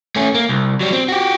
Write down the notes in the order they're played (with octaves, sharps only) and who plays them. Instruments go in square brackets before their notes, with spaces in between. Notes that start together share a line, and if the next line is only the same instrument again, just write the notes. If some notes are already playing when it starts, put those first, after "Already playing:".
[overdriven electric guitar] A3 C#4
A#3
C2
F#3 G3
C4
F#4 G4